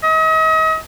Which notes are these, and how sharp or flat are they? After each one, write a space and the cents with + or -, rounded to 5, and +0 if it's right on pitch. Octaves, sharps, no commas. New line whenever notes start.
D#5 +40